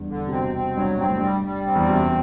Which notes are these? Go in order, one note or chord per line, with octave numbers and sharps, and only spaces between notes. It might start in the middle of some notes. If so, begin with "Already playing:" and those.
Already playing: E2 G2
D3
C3
B2 C4
C4
G2 F#3
G2 C4
A2
G2 G3
G3
C4
E2
F#2 C3